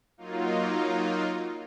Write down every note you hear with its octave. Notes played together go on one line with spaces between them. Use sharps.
F#3 A#3 D#4 F4